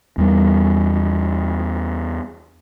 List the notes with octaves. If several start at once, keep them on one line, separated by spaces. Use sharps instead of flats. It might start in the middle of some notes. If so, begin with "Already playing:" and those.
E2 G3